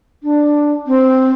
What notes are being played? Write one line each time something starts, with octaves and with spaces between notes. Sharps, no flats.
D4
C4